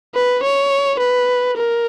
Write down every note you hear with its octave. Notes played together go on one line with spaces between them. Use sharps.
B4
C#5
B4
A#4